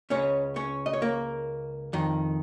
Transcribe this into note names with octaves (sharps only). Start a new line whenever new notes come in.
C#2 C#3 C#4 C#5
C#4 C#5
D#5
C#5
A#3 A#4
F2 D#3